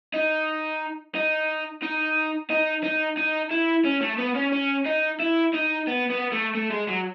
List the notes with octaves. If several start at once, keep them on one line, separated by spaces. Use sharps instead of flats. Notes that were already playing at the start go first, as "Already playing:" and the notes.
D#4
D#4
D#4
D#4
D#4
D#4
E4
C#4
A3
B3
C#4
C#4
D#4
E4
D#4
B3
B3
A3
A3
G#3
F#3